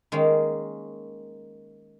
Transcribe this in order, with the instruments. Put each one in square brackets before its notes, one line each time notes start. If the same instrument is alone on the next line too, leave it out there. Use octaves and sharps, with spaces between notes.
[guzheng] D#3 G#3 A#3 C#4